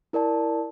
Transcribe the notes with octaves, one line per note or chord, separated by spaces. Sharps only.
E4 A#4 D5 A5